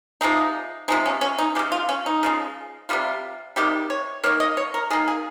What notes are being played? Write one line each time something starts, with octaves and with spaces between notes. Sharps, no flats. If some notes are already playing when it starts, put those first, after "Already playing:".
C3 F3 G#3 D#4
C3 F3 G#3 D#4
C#4
C#4
D#4
C#3 F3 G#3 G4
F4
C#4
D#4
C#3 F3 G#3
C3 D#3 G3 F4
C3 D#3 G3 G4
C#5
D#3 A#3 C#5
D#5
C#5
A#4
D#3 A#3 G#4
G#4